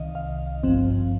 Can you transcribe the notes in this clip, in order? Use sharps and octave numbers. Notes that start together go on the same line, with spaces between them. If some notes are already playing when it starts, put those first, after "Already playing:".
Already playing: C2 C3 D#3 D#5 F5
F5
G#1 G2 F3 C4